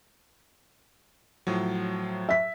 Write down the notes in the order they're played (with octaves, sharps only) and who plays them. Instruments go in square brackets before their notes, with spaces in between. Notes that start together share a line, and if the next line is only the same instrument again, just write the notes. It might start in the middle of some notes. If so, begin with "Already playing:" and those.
[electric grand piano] A2 F3 F#3
[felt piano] E5 B6